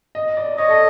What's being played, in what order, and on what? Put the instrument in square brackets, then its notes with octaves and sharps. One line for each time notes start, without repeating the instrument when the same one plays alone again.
[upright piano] D#5
D5
[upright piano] C#5 [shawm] D#5
[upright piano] A4